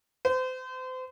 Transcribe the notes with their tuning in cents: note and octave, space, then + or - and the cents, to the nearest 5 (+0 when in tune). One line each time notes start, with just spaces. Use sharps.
C5 -35